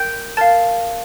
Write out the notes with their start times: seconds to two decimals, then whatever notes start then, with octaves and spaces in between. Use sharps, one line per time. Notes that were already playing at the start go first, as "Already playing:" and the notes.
Already playing: A#4 G5 G6
0.37 A#4 F5 A5 A6